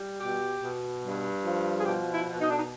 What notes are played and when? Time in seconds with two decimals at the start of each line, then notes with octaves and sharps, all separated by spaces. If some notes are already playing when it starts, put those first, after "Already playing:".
Already playing: G3
0.21 B2 G4
0.62 B2
1.03 G2
1.45 F3
1.80 G#4
1.86 B2 G4
2.14 E4
2.27 B2
2.41 D#4
2.50 D4
2.59 D#4